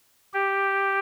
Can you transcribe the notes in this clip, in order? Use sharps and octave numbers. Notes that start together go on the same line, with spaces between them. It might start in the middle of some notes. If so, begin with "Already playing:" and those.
G4